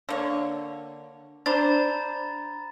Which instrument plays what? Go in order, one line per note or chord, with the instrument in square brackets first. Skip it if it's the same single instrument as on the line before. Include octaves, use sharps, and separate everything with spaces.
[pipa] D3 A#3 C#5
[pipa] D4 C5 [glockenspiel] A#5 B5 A6